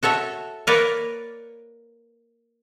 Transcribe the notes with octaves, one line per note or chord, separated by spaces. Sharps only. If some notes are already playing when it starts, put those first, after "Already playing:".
F#4 A4 C#5 E5
A#3 A#4 B4 C#5 D5